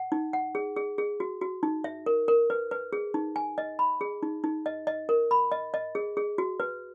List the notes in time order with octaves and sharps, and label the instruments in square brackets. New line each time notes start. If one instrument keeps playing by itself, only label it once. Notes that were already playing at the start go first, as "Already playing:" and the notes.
Already playing: [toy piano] F#5
D#4
F#5
G#4
G#4
G#4
F#4
F#4
D#4
E5
A#4
A#4
B4
B4
G#4
D#4
G#5
D#5
B5
G#4
D#4
D#4
D#5
D#5
A#4
B5
D#5
D#5
G#4
G#4
F#4
B4